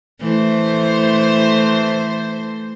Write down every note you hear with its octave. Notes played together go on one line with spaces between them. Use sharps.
E3 A3 C5